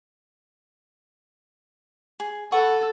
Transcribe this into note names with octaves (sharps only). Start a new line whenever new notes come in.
G#4
A4 B4 F#5 C#6